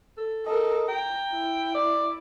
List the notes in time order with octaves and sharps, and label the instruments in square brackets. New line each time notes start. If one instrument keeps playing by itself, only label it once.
[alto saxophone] A4
[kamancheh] A4 A#4 [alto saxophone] D#5
[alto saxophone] G5 [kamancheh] A#5
[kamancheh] E4
[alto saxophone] D5